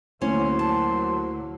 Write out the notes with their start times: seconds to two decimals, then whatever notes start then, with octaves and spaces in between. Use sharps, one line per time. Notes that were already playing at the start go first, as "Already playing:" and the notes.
0.21 D2 D3 F#3 A3 A#3 C#4 E4 C5
0.59 A5